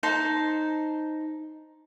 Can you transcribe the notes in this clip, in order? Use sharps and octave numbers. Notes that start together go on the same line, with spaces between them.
D#4 C5 A5